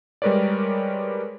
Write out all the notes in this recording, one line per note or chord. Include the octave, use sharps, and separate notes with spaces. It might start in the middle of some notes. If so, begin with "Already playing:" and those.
G3 G#3 A#4 B4 C#5 D5